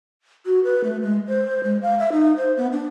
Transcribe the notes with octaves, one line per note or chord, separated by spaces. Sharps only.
F#4
B4
A3
G#3
C5
G#3
F5
E5
D#4
C5
B3
D4